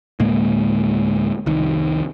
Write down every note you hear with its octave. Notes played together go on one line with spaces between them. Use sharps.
D2 A2 G#3 A#3
F1 C2 D#3